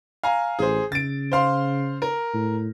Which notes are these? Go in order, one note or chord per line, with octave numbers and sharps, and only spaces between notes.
F5 G#5 A#5
A1 G#4 C5
C#3 A6 D7
C5 F5 C6
A#4
A2